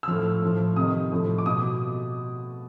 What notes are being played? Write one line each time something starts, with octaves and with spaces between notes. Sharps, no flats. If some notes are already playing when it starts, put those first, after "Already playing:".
E6
A2 F3 F6
A2 F3
C3 D#3 D#6
A2 F3
D6
B2 D#6